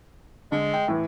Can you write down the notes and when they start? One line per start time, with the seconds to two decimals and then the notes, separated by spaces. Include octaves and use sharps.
0.52 D3 G#3
0.74 G5
0.88 A2 E3